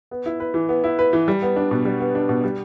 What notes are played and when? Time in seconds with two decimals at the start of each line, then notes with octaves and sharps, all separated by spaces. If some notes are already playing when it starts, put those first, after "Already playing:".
0.11 B3
0.26 E4
0.40 B4
0.54 E3
0.69 B3
0.84 E4
0.99 B4
1.13 E3
1.28 G3
1.42 B3
1.56 D4
1.71 B2
1.85 G3
2.00 B3
2.15 D4
2.29 B2
2.44 G3